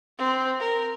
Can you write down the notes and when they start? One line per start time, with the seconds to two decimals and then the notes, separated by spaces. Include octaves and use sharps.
0.18 C4
0.60 A#4